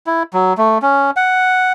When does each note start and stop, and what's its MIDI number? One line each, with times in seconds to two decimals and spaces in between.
0.07 0.23 64
0.33 0.53 54
0.58 0.78 57
0.82 1.11 61
1.16 1.73 78